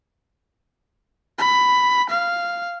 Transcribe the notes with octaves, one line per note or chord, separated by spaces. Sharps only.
B5
F5